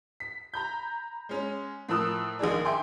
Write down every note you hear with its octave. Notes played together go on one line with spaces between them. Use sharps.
B6
A#5 B5 G6
G#3 C#4
A2 F3 A#4 D#6 E6 F#6
A#1 D#3 G#4 D5
E5 G5 G#5 C6 D6